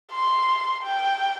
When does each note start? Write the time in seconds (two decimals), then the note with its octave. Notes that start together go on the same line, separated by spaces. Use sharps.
0.13 C6
0.84 G5